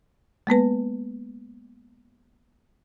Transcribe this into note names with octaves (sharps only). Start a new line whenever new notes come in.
G#3 A#3 B3 B4